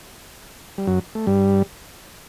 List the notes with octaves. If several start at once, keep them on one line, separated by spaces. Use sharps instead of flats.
G3
F#2 F#3
A3
G2 G3